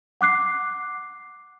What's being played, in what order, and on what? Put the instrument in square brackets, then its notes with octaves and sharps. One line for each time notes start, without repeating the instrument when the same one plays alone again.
[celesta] F#5 D6 F#6 C7